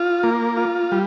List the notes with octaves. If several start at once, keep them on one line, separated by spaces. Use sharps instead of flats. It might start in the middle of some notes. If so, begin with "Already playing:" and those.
Already playing: F4
A#3
F4
G3